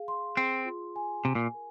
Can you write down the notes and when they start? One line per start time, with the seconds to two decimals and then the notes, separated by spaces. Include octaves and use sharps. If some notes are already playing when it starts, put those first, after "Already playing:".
Already playing: G#4 F5
0.08 C6
0.37 C4 G#4
0.65 F4
0.96 G#5
1.25 C3 G#5
1.35 A#2
1.54 A#4